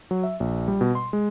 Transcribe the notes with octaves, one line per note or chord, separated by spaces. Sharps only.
F#3
E5
A#1
G3
B2
C6
G#3